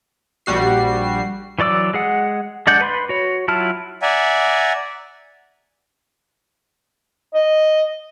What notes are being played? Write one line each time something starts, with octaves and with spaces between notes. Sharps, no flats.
A#1 G3 F#4 C7
E3 F#3 D5 D6 E6
G#3 G#4 F#5
G#3 D4 D5 F#5 G6
B4 B5 C6
F#4 C#5
F#3 E4 F4 A5 F6
D5 E5 F#5 G#5 A#5
D#5